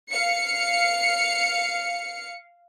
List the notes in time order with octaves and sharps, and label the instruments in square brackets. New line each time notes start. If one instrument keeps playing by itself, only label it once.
[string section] F5 C#7